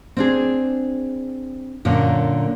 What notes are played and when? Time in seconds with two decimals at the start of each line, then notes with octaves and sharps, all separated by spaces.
0.17 C4 D4 G#4
1.85 F#2 A#2 D3